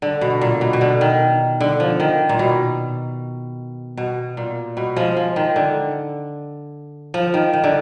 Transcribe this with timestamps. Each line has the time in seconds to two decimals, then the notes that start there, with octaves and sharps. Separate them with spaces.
0.02 D3
0.21 B2
0.41 A#2
0.61 B2
0.73 B2
0.81 D3
1.01 D#3
1.61 D3
1.80 F3
2.00 D#3
2.29 A#2
2.39 B2
3.97 B2
4.37 A#2
4.77 B2
4.96 F3 G#3
5.17 F3
5.36 D#3
5.56 D3
7.14 F3
7.34 D#3
7.53 D#3
7.64 D3